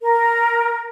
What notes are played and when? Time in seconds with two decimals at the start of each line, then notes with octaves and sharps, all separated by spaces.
0.01 A#4